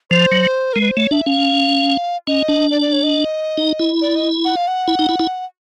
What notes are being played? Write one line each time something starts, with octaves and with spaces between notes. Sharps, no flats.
F3 C5
F#3
G#3 A#4
B4
C5
A3 C#5
D4 E5
C#4 F5
C#4 D#5
D4
D5
D5
C#5
D#5
D#4
E4
D5
D#5
F#5
F5
F#5
E4
D#4
E4
E4